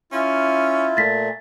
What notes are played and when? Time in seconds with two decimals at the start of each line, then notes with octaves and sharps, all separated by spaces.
0.12 C#4 E4 F4
0.97 A#2 A3 A6 B6